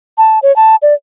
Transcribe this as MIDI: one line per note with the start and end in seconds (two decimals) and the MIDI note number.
0.18 0.39 81
0.43 0.54 73
0.56 0.76 81
0.82 0.94 74